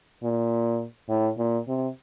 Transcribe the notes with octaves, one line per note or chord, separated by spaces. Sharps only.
A#2
A2
A#2
C3